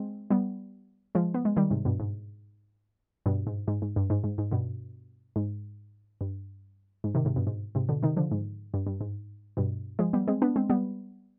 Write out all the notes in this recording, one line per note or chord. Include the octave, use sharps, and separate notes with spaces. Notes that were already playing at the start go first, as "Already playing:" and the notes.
Already playing: G#3 C4
G3 B3
F3 G#3
B3
G#3
D#3 G3
G#2 C3
G2 B2
G#2
G2 B2
G#2
G#2
G#2
G2
G#2
G#2
G#2
G2 B2
G#2
G2
G#2
C3 D#3
G#2 C3
G2 B2
G#2
G#2 C3
B2 D3
C3 D#3
D3 F3
G#2
G2
G2
G#2
G2 B2
F3 G#3
G3 B3
G#3 C4
B3 D4
G#3 C4
G3 B3